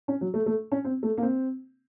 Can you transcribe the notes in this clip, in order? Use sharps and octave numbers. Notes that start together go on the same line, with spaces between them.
C#4
F#3
A3
A3
C#4
C4
A3
A#3
C4